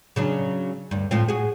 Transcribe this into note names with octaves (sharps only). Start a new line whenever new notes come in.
C#3 F#3 D4
D2 G2
A2 F3 C4
F#4 G#4